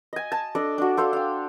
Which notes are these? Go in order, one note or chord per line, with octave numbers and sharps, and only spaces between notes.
D#5 G#5
A5
D4 A4 D5 D#5
D4 F#4
A4 C5 F5
F5 G5